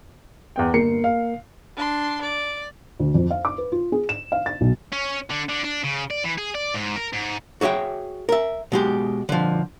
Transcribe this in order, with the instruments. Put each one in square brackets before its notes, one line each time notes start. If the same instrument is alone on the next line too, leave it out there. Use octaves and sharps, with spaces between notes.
[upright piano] E2 B3 G5
[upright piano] G1 C7 C#7 [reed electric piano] A#3 A#4
[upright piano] F5
[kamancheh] D4 C6
D5
[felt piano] D2
F2
F5
D6
B4
F4
G#4
E7
F5
A6
B1
[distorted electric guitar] C#4
D3
D3
D4
C#3
D5
E3
G#4
D5
G#2
A#4
G#2
[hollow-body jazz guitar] F#4 G#4 C#5 E5 G5
A#4 E5
B2 G#3 G4
D3 F3